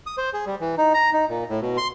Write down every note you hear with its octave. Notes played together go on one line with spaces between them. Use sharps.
D#6
C5
G#4
G3
E3
D#4
A#5
D#4
A#2
A2
B2
C6